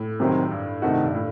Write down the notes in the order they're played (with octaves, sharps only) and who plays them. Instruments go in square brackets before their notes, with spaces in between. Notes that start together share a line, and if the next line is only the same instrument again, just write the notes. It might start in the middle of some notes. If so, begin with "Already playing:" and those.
Already playing: [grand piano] A2
[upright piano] C2 C3 D#3 F#3 C4
[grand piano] G2
[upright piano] C3 D#3 A3 D#4 F#4
[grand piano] G2
A2